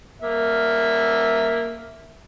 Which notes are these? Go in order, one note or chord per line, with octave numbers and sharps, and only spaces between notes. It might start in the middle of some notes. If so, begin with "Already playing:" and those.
A#3 E5